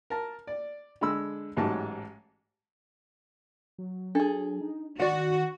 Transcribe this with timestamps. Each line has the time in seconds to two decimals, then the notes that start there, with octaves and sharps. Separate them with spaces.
0.10 A#4 A5
0.47 D5
1.01 D3 G#3 B5 E6
1.57 A1 G#2 F#3 G4 A5
3.79 F#3
4.15 D4 G#4 A4
4.61 D#4
4.99 D#3 F#4 D5 F#5